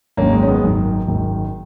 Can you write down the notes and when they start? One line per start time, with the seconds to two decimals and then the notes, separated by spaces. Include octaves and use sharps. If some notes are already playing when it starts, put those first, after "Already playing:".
0.17 G#1 F#2 D#3 A#3 C#4
0.33 G#3
0.43 C#4
0.47 G#3 B3
0.62 G#1 F#2 D#3
1.07 G#1 F#2 D#3